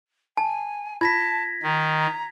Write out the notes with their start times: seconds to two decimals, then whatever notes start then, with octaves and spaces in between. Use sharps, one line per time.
0.37 G#5 A5
1.01 F4 A5 G#6 A#6 B6
1.63 D#3 A#5